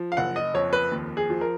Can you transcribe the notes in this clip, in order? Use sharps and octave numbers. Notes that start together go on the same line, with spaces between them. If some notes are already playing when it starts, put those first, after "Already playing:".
Already playing: F3
F5
F#1 F#5
D#5
F2 C#5
B4
D#2
G#4
F3
A#4